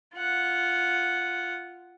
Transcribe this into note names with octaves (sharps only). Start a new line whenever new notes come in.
F4 F#5